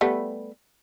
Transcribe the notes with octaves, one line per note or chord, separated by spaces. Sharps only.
G3 A3 B3